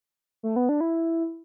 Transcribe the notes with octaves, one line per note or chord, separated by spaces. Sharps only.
A3
B3
D4
E4